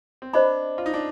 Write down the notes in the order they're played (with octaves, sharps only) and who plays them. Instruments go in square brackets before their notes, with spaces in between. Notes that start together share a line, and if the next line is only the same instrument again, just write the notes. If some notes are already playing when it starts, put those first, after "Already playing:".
[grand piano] C4
[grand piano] D4 [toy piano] C5 D#5 B5
[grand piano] F4
D#4
D4